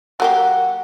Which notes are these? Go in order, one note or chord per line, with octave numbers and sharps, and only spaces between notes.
F#3 A#3 G4 F#5